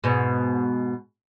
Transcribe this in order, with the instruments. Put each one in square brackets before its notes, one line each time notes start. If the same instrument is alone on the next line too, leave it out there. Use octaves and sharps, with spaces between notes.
[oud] G#2 B2